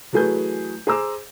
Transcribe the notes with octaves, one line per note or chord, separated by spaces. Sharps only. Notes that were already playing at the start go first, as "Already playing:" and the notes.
E3 F#3 A3 G#4 B4 G6
G#4 C5 A#5 D6 E6